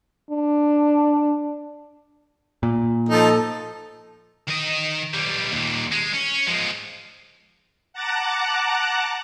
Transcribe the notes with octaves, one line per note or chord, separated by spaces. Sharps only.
D4
A#2
F3 D#4 A4
D#3 D#5
B1 G3
D#2 A#2
G#3
C#4
F3 G#3
F#5 A5 A#5 D6 F#6